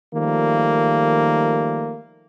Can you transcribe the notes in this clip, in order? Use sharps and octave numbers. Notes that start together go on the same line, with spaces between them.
D#3 F3 G3 A3 A#3